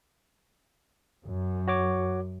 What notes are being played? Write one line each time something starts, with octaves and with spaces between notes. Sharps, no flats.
F#2
F#4 C#5 D6